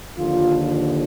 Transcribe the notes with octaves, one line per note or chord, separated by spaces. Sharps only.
D#2 D3 F3 F4